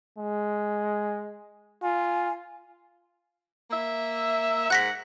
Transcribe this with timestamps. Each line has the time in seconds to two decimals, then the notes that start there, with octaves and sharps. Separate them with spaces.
0.19 G#3
1.83 F4 G#5
3.71 A#3 E5
4.70 G#2 F#5 F#6 A#6 B6